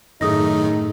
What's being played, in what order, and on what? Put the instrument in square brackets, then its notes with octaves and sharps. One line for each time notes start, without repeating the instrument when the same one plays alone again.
[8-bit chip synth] F#2 D#3 A3 [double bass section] A2 [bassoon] D#4 [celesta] G#4 D#6 A#6